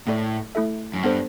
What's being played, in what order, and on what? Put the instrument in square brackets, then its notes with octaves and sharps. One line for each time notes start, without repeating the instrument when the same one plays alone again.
[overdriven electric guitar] A2 [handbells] A3 E4 A4 D5
[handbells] A3 E4 A4 E5
[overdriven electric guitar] F#2
[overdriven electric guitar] G2 [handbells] B3 D4 A4 C5